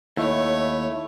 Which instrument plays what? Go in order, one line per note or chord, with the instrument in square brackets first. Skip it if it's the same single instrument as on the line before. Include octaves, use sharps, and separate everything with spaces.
[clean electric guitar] D#2 [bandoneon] A3 [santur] E4 [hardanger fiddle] C#5